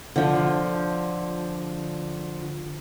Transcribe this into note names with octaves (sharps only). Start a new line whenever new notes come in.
D3 F3